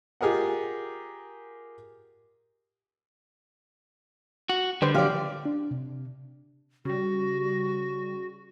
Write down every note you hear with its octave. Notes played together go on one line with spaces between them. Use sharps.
F4 G4 G#4 A#4 D#5 F#5
F#4
D3 G3 B4 C5
F3 F#3 G4 D5 F5
D4
C3
C#3 G3 F#4